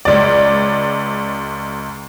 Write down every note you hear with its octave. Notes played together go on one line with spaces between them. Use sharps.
C#2 D5